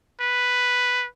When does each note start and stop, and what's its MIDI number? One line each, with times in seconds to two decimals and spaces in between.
0.21 1.06 71